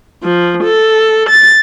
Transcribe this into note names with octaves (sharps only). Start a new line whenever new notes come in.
F3
A4
A6